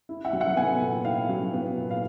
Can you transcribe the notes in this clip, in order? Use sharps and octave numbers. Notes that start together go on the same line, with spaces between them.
E4
E5 F#5
F#3
E5 F#5
B3 F#5 G#5
A#2
E4 F5 G5
F#3
B3
A#2
F5